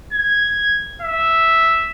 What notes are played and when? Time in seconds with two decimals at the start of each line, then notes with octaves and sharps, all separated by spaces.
0.13 G#6
1.02 E5